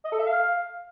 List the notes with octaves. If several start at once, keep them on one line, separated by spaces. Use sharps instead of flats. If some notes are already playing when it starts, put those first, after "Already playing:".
D#5
A4
E5
F5